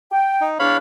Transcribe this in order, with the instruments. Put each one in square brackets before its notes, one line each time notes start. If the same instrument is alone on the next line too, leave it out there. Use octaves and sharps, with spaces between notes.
[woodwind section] G5
[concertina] D#4
[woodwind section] E2 D4 [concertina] C#5 F5 B5